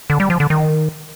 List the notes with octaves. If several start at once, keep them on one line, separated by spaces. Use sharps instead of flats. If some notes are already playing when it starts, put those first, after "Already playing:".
D3
G3
F3
D3
D#3